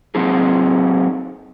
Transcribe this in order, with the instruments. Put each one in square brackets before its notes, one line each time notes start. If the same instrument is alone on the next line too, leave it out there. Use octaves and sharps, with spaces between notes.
[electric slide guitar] F#3 C4 D#4 G#4